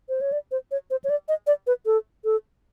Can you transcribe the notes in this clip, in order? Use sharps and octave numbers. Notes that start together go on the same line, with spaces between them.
C5
C#5
D5
C5
C#5
C5
C#5
D5
D#5
D5
B4
A4
A4